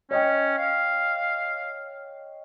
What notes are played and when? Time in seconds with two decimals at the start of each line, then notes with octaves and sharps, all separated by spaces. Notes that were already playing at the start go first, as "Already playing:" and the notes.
0.11 C#4 C#5 D#5 G5
0.58 F5